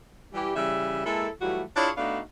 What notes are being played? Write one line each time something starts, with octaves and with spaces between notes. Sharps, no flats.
E3 G3 G4
C#3 E3 G3 E5
G#3 A#3 E4 A4
E3 F#3 G3 A3 F4 F#4
D4 E4 F4 G#4 C#5
A3 B3 D4 D#4 F#4 F5